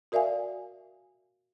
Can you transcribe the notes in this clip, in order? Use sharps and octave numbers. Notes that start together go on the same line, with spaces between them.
F#4 A#4 D5 E5 F5 G#5